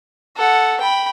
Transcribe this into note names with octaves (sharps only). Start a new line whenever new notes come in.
A4 F#5
G5 B5